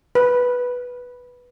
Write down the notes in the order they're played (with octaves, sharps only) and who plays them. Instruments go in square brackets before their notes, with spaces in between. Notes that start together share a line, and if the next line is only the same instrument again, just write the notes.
[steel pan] B4